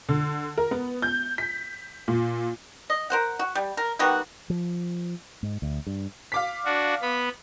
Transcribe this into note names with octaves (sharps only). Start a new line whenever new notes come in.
D3
A#4
B3
G6
B6
A#2
D#5
A#4 C5 F#5
F#4
G3
A#4
D#3 G3 B3 F#4
F3
G#2
D2
G2
F5 D6 B6
D4 F#4
B3 B5